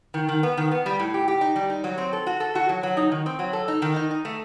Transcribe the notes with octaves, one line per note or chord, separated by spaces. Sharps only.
D#3
D#3
B3
D#3
B3
G3
A2
G4
G4
D#4
G3
D#4
F#3
C4
A4
F#4
A4
F#4
F#3
F#3
D#4
D#3
C4
F#3
A4
D#4
D#3
D#4
D#4
A3